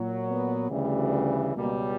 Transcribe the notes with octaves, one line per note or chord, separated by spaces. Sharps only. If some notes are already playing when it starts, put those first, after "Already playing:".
Already playing: A#2 F#3
B3
D2 C#3 E3 G3
C#2 B2 G3 A#3